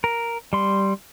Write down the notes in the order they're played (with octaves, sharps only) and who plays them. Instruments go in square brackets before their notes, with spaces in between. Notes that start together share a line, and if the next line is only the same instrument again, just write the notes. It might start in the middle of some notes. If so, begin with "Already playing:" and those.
[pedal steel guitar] A#4
G3 C6